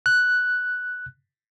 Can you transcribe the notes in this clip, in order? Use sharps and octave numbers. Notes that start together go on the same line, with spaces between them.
F#6